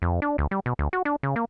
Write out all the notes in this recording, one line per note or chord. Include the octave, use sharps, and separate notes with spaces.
F2
D4
D2
G3
B2
D2
F#4
D4
C#3
A#3